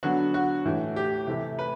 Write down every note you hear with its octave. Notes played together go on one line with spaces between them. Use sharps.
D3 F#3 B3 F#4
F#4
A2 E3 A3
G4
C3 E3 A3
B4